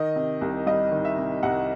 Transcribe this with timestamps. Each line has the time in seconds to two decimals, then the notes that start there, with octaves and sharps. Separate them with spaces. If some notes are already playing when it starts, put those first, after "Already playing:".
Already playing: D#3 D#5
0.16 C3
0.41 C2
0.66 G3 D#5
0.91 D#3
1.05 E5
1.18 C3
1.43 C2 F#5